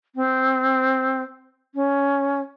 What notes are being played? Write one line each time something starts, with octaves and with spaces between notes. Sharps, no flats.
C4
C#4